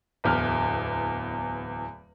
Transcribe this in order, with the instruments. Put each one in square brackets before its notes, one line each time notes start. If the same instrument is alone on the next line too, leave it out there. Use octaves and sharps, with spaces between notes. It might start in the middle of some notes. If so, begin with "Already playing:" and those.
[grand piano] D1 E2 F6